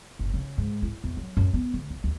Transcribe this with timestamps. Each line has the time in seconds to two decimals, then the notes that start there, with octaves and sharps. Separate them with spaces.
0.19 F#1
0.34 C#3
0.58 G#2
0.82 E4
1.04 E2
1.17 F#3
1.37 F#2
1.54 B3
1.74 D2
1.90 F#1
2.04 D#2